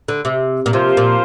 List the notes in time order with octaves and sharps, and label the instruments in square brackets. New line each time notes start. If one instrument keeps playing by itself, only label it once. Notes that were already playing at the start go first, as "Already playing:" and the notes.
[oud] D3
C3
A#2
[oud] C3 [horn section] F3 A#3 F4 C5
[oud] A#2